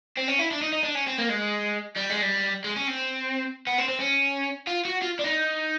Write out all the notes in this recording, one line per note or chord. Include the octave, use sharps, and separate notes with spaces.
C4
C#4
E4
D4
D#4
D#4
D4
C#4
C4
A#3
G#3
G3
G#3
G3
G#3
C#4
C4
B3
C4
C4
C#4
F4
F#4
F4
D4
D#4